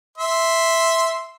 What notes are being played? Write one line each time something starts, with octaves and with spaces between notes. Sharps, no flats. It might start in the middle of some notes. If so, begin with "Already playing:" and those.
E5 C6